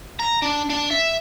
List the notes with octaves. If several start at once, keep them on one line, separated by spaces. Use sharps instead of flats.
A#5
D4
D4
E5